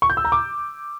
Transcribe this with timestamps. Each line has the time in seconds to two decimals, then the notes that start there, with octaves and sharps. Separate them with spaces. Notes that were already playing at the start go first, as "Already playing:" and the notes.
0.02 C#6
0.10 G6
0.17 E6
0.25 A#5
0.32 D6